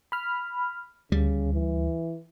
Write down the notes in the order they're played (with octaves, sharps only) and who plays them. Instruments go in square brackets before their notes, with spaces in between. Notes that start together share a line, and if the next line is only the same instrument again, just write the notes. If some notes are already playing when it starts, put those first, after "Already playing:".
[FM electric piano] B5 F6
[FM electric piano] D2 [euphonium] C#3 [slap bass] G3
[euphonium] E3